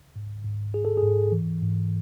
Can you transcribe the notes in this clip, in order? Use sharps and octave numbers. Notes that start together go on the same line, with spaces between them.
G#2
G#2
G#2 G#4
A4
G#4
G#2
E3
G#2